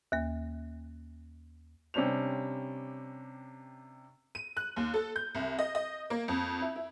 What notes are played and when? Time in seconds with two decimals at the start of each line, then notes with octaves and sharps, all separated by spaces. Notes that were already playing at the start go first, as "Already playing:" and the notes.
0.12 D#2 A#3
1.94 C3 G3 C#4 D4 C5 F7
4.35 D#7
4.57 F#6
4.76 D#2
4.94 A4
5.16 G6
5.35 C2
5.59 D#5
5.75 D#5
6.10 A#3
6.28 F2
6.61 E4
6.75 E4